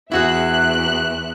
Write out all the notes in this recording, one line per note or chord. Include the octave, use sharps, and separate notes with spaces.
E2 E4 F#4 G#4 E5 F#6